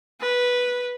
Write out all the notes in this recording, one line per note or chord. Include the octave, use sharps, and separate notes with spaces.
B4